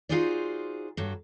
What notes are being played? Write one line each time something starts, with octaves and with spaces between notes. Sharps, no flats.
D#4 F4 F#4 G#4 C5 D5
G2 F#3 A4